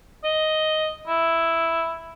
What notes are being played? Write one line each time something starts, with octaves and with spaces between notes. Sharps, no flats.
D#5
E4